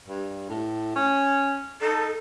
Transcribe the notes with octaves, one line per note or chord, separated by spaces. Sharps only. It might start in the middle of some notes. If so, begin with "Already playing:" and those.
G2
A2
C#4
D#4 A4